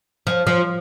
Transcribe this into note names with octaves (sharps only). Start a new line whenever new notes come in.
F3
F3